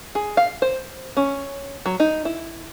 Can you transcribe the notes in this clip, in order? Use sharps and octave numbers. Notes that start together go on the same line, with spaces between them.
G#4
F5
C5
C#4
F#3
D#4
E4